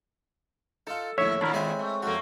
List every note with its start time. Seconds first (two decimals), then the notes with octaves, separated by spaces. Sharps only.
0.87 D#4 F4 A4
1.18 A#1 D#2 A2 D3 E4 C#5 E5
1.41 D#2 A#2 D4 E4 A#4
1.54 G#3 C4 E5 G#5 B5
1.79 A3
2.02 F2 A3 A#3 F#4